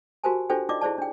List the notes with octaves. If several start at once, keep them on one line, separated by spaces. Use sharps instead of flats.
F#4 G4 A#4 C5 G#5 A5
D4 F4 G4 A4 C5 G5
D#4 F4 D5 D#5 D6
E4 G#4 C5 D5 A5
D4 G5